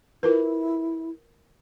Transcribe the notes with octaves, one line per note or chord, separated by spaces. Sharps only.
E4 F4 A#4 B4